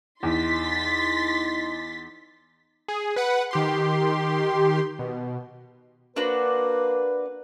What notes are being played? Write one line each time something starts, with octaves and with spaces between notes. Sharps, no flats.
E2 D#4 C6 A6 B6
G#4
B4 F#5
D#3 G4 C6
B2
A#3 D4 F#4 B4 C5